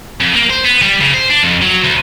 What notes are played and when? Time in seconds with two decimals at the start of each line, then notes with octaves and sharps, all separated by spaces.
0.20 F2
0.35 A#3
0.50 C5
0.64 B3
0.82 G3
1.01 C#3
1.14 C5
1.30 D4
1.43 F2
1.62 F#3
1.84 D2